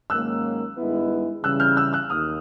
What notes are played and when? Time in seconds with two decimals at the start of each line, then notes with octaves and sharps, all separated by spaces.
0.10 G#2 D#3 F#3 A#3 C#4 E6 F#6
0.76 G2 D#3 G#3 B3 E4
1.43 C#3 E3 G3 E6 F#6
1.60 F6 G6
1.76 E6 F#6
1.93 E6 F#6
2.10 D#2 D#6 F6